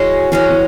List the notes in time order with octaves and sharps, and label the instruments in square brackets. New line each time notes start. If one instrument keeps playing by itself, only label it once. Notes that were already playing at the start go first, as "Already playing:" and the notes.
Already playing: [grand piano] E3 [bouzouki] G#3 C#4 F#4
[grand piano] E3 [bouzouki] G#3 C#4 F#4
[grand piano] E3